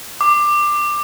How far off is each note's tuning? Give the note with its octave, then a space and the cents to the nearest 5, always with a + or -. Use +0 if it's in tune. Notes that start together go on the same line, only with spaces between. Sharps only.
D6 +15